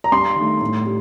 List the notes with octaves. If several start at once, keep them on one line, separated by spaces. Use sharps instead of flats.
A#5
G2 C6
D#3 A3
A2
G3